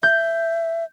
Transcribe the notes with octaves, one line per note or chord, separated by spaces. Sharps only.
E5 G6